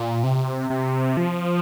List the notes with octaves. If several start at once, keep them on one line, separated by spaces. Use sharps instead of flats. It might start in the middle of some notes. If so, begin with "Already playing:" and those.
Already playing: A#2
C3
C3
F3